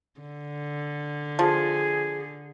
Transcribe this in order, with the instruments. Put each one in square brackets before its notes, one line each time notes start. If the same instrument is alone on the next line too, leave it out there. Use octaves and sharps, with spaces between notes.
[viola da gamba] D3
[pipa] F3 [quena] G#4